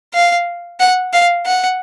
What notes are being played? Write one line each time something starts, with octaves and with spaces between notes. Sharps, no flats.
F5
F#5
F5
F#5